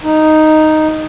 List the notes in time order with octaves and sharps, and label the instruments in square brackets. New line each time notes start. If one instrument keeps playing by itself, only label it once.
[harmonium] D#4